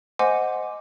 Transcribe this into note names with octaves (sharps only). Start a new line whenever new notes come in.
C5 D#5 F#5 G#5 C6 D6